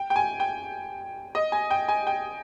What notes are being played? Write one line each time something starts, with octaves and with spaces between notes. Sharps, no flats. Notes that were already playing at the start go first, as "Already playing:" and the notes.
Already playing: G5
G5
G#5
G5
D#5
G#5
G5
G#5
G5